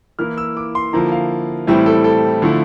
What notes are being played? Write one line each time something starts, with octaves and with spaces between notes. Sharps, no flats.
E3 A#3 E4 F6
E6
D6
C6
D3 F3 A#3 E4 A#5
F5
A2 E3 G3 C4 E4 E5
A4
A4
D3 F3 A3 E4